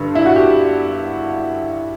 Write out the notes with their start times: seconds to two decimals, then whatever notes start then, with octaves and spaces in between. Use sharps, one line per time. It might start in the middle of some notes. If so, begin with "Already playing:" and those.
Already playing: G2 D3
0.15 E4
0.26 F#4
0.36 G4